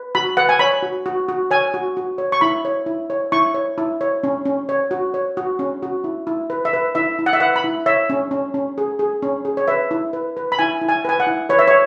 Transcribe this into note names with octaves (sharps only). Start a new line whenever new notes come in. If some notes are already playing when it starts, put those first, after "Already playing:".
Already playing: B4
F#4 B5
B4 F#5
G#5
C#5 B5
F#4
F#4
F#4
C#5 G#5
F#4
F#4
C#5
C#6
E4 B5
C#5
E4
C#5
E4 C#6
C#5
E4
C#5
C#4
C#4
C#5
F#4
C#5
F#4
C#4
F#4
E4
E4
B4
E5
B4
E4 E5
E4
F#5
E5
B4 F#5
B5
E4
C#5 E5
C#4
C#4
C#4
G#4
G#4
C#4
G#4
C#5
B4 E5
E4
B4
B4
B5
E4 G#5
E4
G#5
B4 G#5
F#5
E4
B4 C#5
E5
C#5